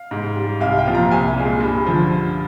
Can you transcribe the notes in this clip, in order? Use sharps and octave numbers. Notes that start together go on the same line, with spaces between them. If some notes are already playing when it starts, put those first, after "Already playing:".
Already playing: F5
G#2
G3
C2 F5
G5
A#2 F3
A#5
C2 G#5
A#2 G#3
G2
D3 F3